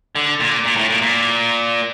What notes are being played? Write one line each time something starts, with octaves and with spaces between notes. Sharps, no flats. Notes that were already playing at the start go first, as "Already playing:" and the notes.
D3
A#2
A#2
A2
A#2
A#2